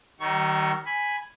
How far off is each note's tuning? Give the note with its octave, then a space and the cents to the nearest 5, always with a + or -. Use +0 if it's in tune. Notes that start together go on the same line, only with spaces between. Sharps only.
D#3 +0 G3 -45 C#6 +0
G#5 +0 B5 +0